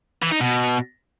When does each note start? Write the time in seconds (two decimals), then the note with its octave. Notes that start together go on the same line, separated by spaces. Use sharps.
0.22 E3
0.31 D#4
0.40 B2